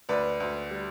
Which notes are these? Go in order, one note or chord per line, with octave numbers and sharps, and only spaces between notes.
D2 B4 D5
D2
G3